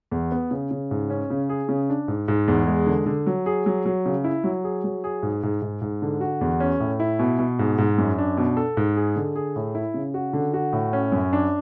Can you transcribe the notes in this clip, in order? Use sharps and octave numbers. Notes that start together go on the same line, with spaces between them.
E2
B3
C#3
C#3
G#2
C#4
C#3
G#4
C#3
D4
G#2
G#2
E2
G#3
D3
D3
F#3
G#4
F#3
F#3
C#3
E4
F#3
G#4
F#3
G#4
G#2
G#2
G#2
G#2
D3
F#4
E2
C#4
A2
E4
B2
B2
G#2
G#2
F#2
D4
B2
A4
G#2
G#4
D3
G#4
A2
E4
C#3
F#4
D3
F#4
A2
C#4
F#2
D4